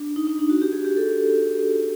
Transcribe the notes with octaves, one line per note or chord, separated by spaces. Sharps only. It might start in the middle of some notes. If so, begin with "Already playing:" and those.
Already playing: D4
D#4
D#4
D4
F#4
G4
G#4
G4
A4